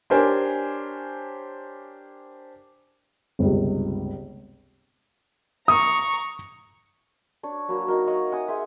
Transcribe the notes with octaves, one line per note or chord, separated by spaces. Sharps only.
D4 G4 A#4 C5 C#5 G#5
G1 C#2 C3
A#5 C#6 D#6
D4 C#5
F#3 A#3 F#4 B4
D#4 F#4 A#4
C#5 D#5 F5 F#5
F#5 G#5 D#6
G#4 C5 E5